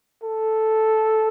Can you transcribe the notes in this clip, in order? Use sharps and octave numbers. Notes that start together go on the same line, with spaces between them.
A4